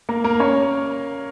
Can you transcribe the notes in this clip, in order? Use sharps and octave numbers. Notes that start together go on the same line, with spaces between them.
A#3 A#4
A#3 A#4
C#4 C#5